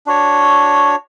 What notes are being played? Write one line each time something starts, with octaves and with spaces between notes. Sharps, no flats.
D4 F#4 C#5